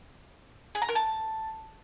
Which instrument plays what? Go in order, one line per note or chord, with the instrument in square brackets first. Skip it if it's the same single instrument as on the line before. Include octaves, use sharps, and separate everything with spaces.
[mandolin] G#4
A#5
A#4
A5